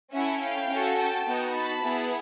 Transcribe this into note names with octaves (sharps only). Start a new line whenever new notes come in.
C#4 E4 A4 E5 F#5
F5 G5
C#4 F#4 A4
G5 A5
B3 D#4 F#4
A5 B5
B3 E4 G#4